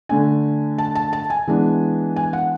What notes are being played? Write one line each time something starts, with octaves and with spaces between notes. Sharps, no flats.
D3 A3 D4 G#5
A5
A5
A5
G#5
E3 G#3 B3 D4
G#5
F#5